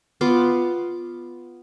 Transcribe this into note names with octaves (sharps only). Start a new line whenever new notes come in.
B3 F4 C6 D6